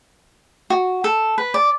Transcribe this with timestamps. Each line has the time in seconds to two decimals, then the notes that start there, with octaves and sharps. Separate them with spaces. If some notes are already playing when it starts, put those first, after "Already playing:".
0.70 F#4
1.04 A4
1.38 B4
1.54 D5